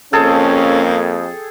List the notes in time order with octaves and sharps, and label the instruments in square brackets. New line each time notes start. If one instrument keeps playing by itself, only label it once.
[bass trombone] F2 [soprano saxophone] A#3 [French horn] C#4 [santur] G#4 A4 G5